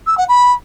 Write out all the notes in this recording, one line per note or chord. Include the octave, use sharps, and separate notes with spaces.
E6
F#5
B5